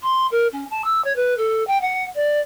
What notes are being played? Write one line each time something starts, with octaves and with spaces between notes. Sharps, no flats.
C6
A#4
C#4
A5
E6
C#5
B4
A4
G5
F#5
D5